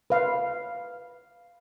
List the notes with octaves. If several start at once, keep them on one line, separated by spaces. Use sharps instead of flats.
B4 F5